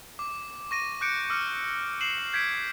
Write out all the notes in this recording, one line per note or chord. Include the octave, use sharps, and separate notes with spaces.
D6
C#6 A#6 D#7
D6 F#6 G6 C#7 D7
D6 E6 F6 C#7
C7 E7 F#7
G6 G#6 B6 C7 D7